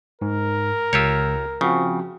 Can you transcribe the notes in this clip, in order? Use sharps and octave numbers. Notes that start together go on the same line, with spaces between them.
G#2 A#4
C#2 F4 G4 C#5 E6
C#3 F3 C4 F#4